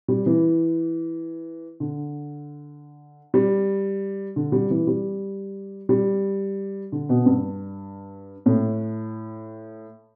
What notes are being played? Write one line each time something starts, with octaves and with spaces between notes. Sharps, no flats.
G3
E3
D3
G3
D3
G3
E3
G3
G3
D3
B2
G2
A2